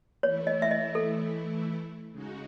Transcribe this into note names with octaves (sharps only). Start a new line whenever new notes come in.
E3 A3 E4 C#5
D#5
E5
D#5
A4
C#3 G#3 D#4 F#4